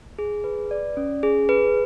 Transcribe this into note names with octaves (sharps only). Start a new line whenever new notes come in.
G#4
B4
D5
C#4
G#4
B4